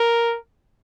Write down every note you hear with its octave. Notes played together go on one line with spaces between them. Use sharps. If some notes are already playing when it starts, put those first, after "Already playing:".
Already playing: A#4